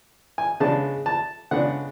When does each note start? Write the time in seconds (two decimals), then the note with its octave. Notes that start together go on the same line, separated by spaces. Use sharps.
0.38 G#5
0.60 C#3 G#3 B3 D4 A5
1.06 A5
1.51 C#3 G#3 B3 D4 F#5